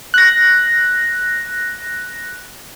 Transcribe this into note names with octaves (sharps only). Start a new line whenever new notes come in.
F#6 A#6